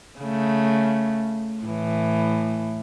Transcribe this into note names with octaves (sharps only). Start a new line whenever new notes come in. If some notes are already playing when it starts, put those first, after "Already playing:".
C#3 A3
A2 E3